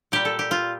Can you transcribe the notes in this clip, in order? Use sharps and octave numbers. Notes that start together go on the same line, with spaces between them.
A#2 G3 G4
A4
G4
F4